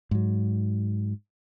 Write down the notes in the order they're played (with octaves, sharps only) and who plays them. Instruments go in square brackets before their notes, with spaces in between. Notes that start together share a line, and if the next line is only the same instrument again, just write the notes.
[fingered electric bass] G#2 F#3